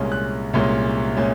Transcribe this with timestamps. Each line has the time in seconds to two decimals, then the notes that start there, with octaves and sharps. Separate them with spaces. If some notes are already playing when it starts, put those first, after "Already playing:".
Already playing: C2 A#2 G#3 C#4
0.12 F#6
0.54 C2 A#2 G#3 C#4
1.16 A#2 G#3 C#4